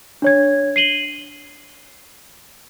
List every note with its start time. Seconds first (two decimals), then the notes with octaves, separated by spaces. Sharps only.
0.22 D4 C#5 G#6
0.76 C7 D#7 F#7 G7